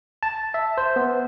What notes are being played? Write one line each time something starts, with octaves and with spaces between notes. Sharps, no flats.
A5
E5
C5
B3